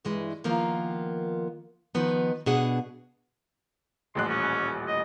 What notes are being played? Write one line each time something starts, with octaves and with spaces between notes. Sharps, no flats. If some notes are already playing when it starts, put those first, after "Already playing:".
G2 E3 G#3
D#3 F3 A#3 B3 F4
D#3 F3 B3 D#4
B2 D4 G#4 F#5
D#1 A1 C6 F#6
C#4
D#5